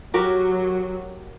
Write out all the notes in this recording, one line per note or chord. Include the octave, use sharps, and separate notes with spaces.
F#3 F#4 G4 A#4